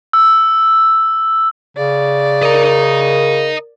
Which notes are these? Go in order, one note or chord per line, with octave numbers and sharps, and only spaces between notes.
E6
C#3 D5
A#4 D#5 A#5